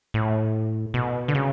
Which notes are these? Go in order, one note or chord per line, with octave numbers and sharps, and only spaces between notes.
A2
B2
D3
C#3